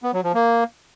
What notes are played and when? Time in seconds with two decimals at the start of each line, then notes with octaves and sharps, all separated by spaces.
0.03 B3
0.13 F#3
0.24 F3
0.34 A#3